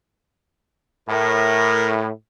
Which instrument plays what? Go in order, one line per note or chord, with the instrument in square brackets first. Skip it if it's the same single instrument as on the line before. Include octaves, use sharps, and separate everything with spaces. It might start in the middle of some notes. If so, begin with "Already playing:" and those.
[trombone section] A2 [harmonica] A#4